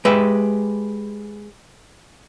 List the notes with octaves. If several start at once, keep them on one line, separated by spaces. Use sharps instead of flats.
G#3 G4 B4 E5